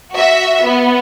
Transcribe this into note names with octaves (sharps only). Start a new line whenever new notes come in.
F#4 E5
B3